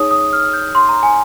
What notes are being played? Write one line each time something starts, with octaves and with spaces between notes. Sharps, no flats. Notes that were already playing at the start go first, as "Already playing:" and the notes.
Already playing: D#4 G#4 C#5 D#6
D#6
F6
G6
C6
A#5
G#5